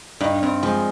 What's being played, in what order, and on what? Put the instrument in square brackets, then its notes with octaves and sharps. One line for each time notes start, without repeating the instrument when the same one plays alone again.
[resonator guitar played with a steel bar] G2 [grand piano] D#4
[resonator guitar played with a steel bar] G2 [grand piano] C4
[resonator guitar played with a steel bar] F3 [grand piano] G#3